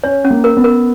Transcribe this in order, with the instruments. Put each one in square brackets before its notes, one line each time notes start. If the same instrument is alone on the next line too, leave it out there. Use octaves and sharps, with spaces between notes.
[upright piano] C#4 [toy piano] C#5
[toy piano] C#4
[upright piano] A#3
[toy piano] A#4
[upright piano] B3
[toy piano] A#4